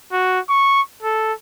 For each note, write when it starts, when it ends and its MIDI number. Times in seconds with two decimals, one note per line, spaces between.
0.12 0.40 66
0.49 0.81 85
1.02 1.33 69